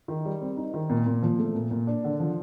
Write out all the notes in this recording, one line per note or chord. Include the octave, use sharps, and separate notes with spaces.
D#3
G3
C4
D#4
D#3
A#2
A#2
F3
A3
A#2
A#2
D4
D3
F3